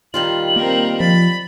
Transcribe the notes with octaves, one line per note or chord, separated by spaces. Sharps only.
D#3 G3 F4 F#7
A#3 C4 A#4
F3 B5 A6